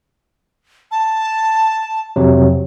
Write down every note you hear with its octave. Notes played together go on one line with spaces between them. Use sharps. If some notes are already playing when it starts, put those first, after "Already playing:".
A5
F2 C3 F#3